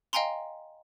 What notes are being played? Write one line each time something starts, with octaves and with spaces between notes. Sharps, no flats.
D#5 F5 G5 G#5 A#5 C6